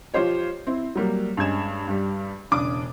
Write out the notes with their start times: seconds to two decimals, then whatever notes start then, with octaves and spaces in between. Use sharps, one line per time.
0.14 F3 F4 G4 C5 C#5
0.67 C4 E4
0.95 F#3 G3 A#3
1.37 G2 G#3 C#4 G#6 E7
1.88 G2 G3
2.51 E1 C#3 D4 D6 D#6